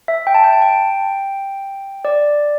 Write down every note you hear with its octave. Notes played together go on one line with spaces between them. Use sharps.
E5
G5
A5
G5
A5
G5
D5